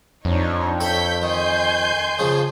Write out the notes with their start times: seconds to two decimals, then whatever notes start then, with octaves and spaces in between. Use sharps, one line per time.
0.25 F2 D4 D#4 C#5
0.81 A4 C#5 G5 B5 G6 B6
1.22 D#3 G#5 C6 G6
2.19 C#3 F3